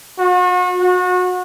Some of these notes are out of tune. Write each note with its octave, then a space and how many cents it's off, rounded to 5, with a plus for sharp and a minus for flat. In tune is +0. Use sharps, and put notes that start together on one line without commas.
F#4 -40
F#4 -30